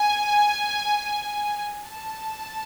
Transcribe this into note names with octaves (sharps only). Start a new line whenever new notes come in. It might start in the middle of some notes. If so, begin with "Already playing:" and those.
Already playing: G#5
A5